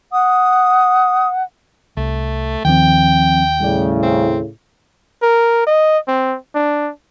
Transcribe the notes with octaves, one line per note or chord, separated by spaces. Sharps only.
F#5 D#6
C2 A3
D#2 D#3 F3 C4 G5
A2 C#3 G3 D5
C4
A#4
D#5
C4
D4